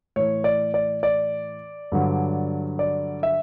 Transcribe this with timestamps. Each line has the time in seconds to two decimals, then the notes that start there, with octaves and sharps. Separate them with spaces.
0.16 A2 E3 C#5
0.44 D5
0.74 D5
1.03 D5
1.92 G2 D3 F#3
2.79 D5
3.23 E5